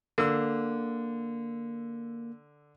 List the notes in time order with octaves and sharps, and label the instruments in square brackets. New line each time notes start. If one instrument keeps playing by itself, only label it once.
[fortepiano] D3 E6 [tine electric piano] A#3